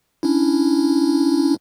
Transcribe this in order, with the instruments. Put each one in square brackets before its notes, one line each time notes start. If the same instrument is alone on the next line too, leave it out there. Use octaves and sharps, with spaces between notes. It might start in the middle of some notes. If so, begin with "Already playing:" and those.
[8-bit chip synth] C#4 D4 E4